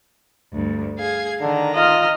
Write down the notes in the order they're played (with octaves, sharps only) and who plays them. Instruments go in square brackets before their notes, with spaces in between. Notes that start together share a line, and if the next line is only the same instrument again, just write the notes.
[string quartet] D2 G2
G#4 F5 G#6
[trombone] D3 [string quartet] D#3 A#5
[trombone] F4 [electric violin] D#5 F6